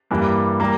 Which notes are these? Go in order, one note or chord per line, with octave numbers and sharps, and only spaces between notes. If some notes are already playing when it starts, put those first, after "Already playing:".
G2 E3 G3 A#3
G3 A#3 A#5